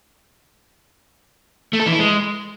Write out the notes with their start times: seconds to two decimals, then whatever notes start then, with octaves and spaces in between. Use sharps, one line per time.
1.73 A3
1.80 A4
1.86 E3
1.93 E4
1.99 G#3